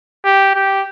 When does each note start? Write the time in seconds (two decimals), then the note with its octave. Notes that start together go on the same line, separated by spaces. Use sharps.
0.25 G4
0.55 G4